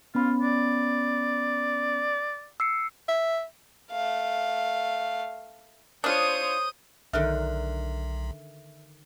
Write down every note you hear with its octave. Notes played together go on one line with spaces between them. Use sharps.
B3 C#4 F4 B5
D5
E6 C7 C#7
E5
A3 F5
D4 F4 C5 C#5 D#6 G6 D#7
B1 D3 D#3 D#4 E5 F6 F#6